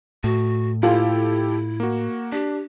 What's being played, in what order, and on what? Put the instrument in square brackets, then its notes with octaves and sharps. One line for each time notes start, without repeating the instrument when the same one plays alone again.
[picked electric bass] A2 [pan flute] F#4
[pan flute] E4 [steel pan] F4 [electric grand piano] G4 A4
[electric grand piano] A#3 F#4
[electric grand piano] D4 [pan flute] G4